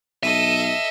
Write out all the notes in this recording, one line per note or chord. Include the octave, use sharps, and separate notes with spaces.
B1 A4 D#5 E5 D#7